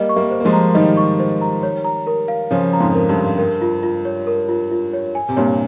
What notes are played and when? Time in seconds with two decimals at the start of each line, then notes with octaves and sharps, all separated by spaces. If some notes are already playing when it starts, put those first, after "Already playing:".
Already playing: G3 A#3 D#5
0.09 C#6
0.16 G3 A#3
0.31 C5
0.40 A#3
0.45 F3 G#3
0.53 A#5
0.75 D#3 G3 D#5
0.97 C#6
1.19 C5
1.41 A#5
1.63 C#5
1.84 A#5
2.07 A#4
2.28 F5
2.51 C#3 F3 C#5
2.73 A#5
2.80 F2 G#2
2.95 A#4
3.09 G2
3.17 F5
3.38 A#4
3.61 F4
3.83 F4
4.05 C#5
4.27 A#4
4.49 F4
4.71 F4
4.93 C#5
5.15 G#5
5.29 C3
5.37 G2 A#2 C#5